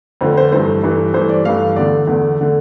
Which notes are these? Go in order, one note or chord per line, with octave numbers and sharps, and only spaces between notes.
F2 D3 A3 C5
C5
G2 E3 A3 C5
G2 E3 A3
G2 E3 A3 C5
D5
G2 E3 A3 F5
E2 D3 A3 D5
E2 D3 A3
D3 A3